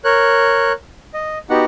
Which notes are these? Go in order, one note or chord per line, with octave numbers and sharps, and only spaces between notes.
A#4 C#5 F#6
D#5
B3 D#4 F#4 G4 F#5